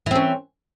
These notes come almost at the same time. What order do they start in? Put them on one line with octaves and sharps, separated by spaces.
E3 C4 C#4